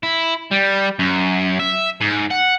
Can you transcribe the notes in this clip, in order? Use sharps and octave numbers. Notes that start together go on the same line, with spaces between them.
E4
G3
F#2
E5
G#2
F#5